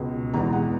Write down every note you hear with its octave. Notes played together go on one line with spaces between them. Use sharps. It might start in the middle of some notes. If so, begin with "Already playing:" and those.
Already playing: C#2 B2 G#3
E2 B2 G#3 A#5
F#5